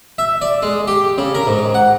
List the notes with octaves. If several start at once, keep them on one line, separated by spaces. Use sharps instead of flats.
E5
D5
G#3
G4
C#3
A#4
G#2
F#5